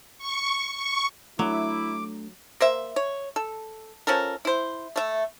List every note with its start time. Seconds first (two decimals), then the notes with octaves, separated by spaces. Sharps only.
0.18 C#6
0.75 C#6
1.39 F#3 A3 D4 E4 D6
2.60 A#3 C5 E5
2.96 C#5
3.36 A4
4.07 F3 C#4 A4 A#4
4.45 E4 C5
4.96 A3 E5